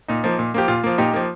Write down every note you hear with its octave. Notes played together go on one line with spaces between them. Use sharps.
A#2 D#4
F3 A#3
A#2
F3 A#3 G4
A#2 F4
F3 A#3
A#2 D#4 G4
F3 A#3